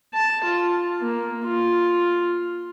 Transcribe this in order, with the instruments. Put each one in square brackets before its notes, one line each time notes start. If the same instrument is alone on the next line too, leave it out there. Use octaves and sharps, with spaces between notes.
[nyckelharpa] A5
F4
A#3
F4